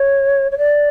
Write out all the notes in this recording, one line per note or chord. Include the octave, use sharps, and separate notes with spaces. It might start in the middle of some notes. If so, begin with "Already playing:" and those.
Already playing: C#5
C#5
D5